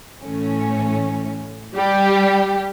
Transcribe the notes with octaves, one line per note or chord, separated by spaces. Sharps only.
A2 E3 A3 C#4
G3 G4